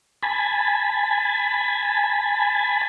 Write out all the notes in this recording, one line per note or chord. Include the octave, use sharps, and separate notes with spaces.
G#5 A5 B5